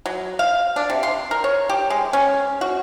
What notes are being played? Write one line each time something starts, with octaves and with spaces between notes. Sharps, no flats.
F#3
F5
D4
C3
C6
A#4
C#5
G4
G#3
C#4
F#4